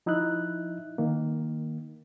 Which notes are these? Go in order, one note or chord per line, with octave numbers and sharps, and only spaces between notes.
F3 D#4 E4 E5 F#6
D#3 A#3